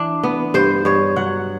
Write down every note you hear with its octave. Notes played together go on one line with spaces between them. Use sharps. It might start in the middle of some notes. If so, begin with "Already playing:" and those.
Already playing: E3 D4
B3
G2 C5
G2 C#5
F#3 F#5